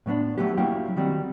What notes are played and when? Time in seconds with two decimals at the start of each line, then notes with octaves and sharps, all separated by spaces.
0.06 A2 F#3 B3 D4
0.38 F#3 G#3 A3 B3 F#4 G4
0.57 F#3 A#3 C#4 E4 G4 G5
0.96 D#3 F#3 G3 C4 F#4